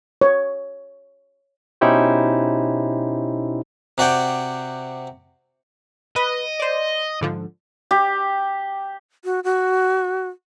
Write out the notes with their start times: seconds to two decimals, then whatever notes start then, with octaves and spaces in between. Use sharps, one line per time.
0.21 C#5
1.81 B2 C#4 D#4 E4 G4 C5
3.98 C3 F#4 D5 G5
6.16 B4 D#5
6.60 C5 D5
7.21 G#2 D3 F3
7.91 G4
9.25 F#4
9.44 F#4